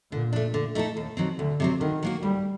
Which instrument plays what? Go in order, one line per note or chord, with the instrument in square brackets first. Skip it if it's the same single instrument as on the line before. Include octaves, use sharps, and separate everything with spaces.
[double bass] A#2 [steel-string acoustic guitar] D3
[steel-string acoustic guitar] A3 D4
D3
A3 D#4 F#4 A4
D#2
D#3 F#3 C4
[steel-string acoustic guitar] D2 [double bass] D3
[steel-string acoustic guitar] C3 F#3 C4
[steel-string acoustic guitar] D3 [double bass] D#3
[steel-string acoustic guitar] F#3 A#3 F#4
[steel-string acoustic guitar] D2 [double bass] G3